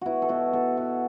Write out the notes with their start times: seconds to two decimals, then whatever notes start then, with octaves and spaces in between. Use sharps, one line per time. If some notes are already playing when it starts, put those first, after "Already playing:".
0.01 B3 E4 F#4
0.22 A4
0.29 B2 F#4
0.53 B3 A4
0.77 B2 F#4